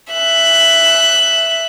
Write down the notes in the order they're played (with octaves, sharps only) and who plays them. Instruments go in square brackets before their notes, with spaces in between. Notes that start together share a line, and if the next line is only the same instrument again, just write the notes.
[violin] E5 F#6